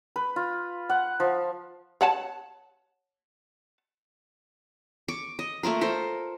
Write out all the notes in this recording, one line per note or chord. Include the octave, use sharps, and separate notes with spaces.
B4
F4
F#5
F3
C#5 F#5 A5
C#6 D6
D#5
A3 A#3 F4 A#4
A4 A#4 C5